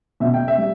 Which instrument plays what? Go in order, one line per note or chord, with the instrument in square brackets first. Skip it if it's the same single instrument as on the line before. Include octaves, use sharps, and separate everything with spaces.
[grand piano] B2 E5
G5
E5
G3